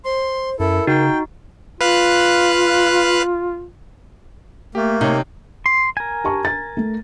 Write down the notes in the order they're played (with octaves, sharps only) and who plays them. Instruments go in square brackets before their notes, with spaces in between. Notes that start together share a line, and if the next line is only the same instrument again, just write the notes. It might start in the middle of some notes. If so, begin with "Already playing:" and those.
[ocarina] C5 [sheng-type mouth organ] C6
[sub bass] F#2 [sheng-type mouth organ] E4 A4 [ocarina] A#4
[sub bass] C#3 [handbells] D#4 F#4 [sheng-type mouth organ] G5
[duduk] F4 [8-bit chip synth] B4 F5 F#6
[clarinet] A3 [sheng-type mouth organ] A#3 [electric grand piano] G4
[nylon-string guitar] C3 [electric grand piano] D#4 C#5
[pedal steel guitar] C6
A#4 G#5
[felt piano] G4 A5 C#6
A6
A3